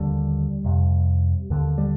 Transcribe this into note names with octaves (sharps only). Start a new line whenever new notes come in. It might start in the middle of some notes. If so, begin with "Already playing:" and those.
Already playing: D#2 D3 G3
F2 C3
D#2 D3
G3